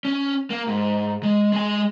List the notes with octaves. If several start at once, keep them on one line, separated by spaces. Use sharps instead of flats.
C#4
A#3
G#2
G#3
G#3 G#5